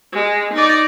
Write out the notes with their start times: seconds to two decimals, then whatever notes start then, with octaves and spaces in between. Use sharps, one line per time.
0.13 G#3
0.54 D#4 D5